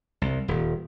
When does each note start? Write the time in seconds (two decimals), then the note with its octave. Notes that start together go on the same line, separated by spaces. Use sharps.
0.22 C2
0.48 D#1